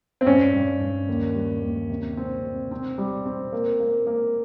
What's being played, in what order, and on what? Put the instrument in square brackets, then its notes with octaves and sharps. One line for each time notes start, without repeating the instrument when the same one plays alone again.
[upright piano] C4
[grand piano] G2 [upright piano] C#4
[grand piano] G2
G2
D#2
G3
D#2
C3
C4
C3
C4
G3
C4
A#3
A#3
A#3